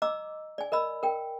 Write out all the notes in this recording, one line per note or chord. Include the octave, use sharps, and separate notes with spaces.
D#5 A#5 D6 E6
D5 G#5
A#4 D#5 B5 E6
A#4 G5